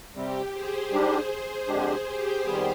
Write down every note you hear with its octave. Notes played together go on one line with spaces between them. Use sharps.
C3 G3 C4 G4
G#4 C5
G#2 G3 D4 G4
F2 D3 G#3 D4 G4
G4
F2 D#3 G3 B3